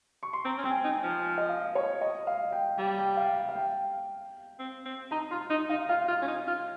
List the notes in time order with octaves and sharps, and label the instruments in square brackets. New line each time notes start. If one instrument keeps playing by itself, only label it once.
[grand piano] C#6
C6
[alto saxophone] C4 [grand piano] A#5
[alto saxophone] C#4
[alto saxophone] C4 [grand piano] G5
[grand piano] G#5
[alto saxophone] D#4
[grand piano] G#5
[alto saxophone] F3
[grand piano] D#5
F5
C#5
D#5
F5
G5
[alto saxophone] G3 [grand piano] G5
[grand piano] G5
F5
G5
F5
G5
[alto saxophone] C4
C4
[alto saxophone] D#4 [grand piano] A#5
[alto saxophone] F4 [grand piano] C6
[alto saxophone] D#4 [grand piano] C6
[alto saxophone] D#4 [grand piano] F5
[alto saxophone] F4 [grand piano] F5
[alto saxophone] F4
C#4
D#4
F4